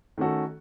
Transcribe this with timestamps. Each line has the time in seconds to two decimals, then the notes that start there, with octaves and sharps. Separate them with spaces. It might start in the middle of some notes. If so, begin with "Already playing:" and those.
0.18 D#3 A3 C#4 F#4 A4